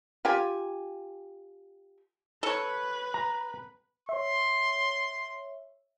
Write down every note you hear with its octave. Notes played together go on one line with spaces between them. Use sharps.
F4 G4 G#5
A4 B4 C#5
A#5
C#5 E5 C6